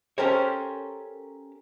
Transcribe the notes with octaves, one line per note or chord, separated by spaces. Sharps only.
C#4 G4 A4 A#4 C5 C#5